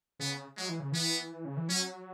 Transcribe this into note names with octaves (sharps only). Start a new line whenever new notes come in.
C#3 B3
F#3 G#3
E3
C#3
E3 B3
C#3
E3
F#3 C#4